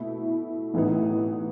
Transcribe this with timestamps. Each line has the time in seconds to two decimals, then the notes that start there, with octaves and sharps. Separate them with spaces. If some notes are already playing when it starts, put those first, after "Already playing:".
Already playing: B2 A3 E4
0.74 A1 A2 E3 B3 D#4